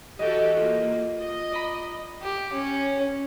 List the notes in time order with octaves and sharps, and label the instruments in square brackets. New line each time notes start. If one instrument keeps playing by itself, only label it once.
[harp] E3 D#5 [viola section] F#4 G4 A4
[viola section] A#3 [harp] F4
[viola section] D#5
[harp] D5 A#5 B5
[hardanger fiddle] G4
C#4